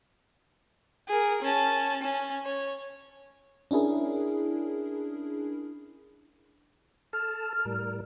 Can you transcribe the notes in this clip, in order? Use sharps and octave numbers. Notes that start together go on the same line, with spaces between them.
G#4 A#4
C#4 A5
C#4
C#5
C#4 D4 E4 G#4 A#4
A4 A5 F6
A2 G3 A#4